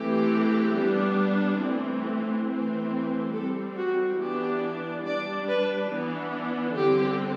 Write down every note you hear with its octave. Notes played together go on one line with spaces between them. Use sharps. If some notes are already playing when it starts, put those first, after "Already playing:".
Already playing: E3 A3 C4 G4
G3 B3 D4
E3 A3 C4
E3 A3 C4
G3 C4 A4
F#4
E3 B3 D4 G4
G3 D4 D5
B4
E3 B3 D4
D3 G3 C4 G4